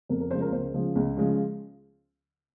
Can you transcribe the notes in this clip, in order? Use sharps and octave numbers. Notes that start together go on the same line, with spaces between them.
F2 A#4
A#4
C#3 F3 G#3 C5
A#4
C#2 C5
C#3 F3 G#3
C#2
C#3 F3 G#3